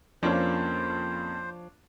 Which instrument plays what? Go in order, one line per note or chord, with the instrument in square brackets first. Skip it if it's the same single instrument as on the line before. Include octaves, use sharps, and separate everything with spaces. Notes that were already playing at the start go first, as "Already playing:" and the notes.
[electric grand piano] F2 A#3 C#4 [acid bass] F3 [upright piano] D4 F4 C#5 [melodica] C5